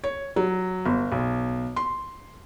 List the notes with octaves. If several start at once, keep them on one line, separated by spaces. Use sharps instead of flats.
C#5
F#3
G1
B1
C6